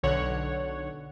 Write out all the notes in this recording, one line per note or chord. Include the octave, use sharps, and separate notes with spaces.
B1 D3 C#5 F#5